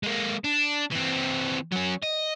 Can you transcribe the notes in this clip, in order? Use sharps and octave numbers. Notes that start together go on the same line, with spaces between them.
G#3 A#3
D4
E3 C4
F#3 C#4
D#5